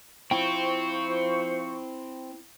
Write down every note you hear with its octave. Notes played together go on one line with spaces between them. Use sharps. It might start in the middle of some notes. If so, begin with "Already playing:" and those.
F3 C4 E4 C5 G5 C#6